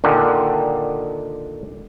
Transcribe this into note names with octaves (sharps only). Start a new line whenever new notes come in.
A#2 D3 D#3